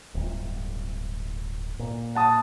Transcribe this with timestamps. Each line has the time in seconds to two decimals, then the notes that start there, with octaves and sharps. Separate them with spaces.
0.15 D1 G1
1.79 A#2
2.15 F#5 A5 D#6